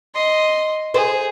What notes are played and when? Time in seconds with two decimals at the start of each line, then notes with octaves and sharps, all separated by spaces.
0.14 D#5 C6
0.94 G#4 C5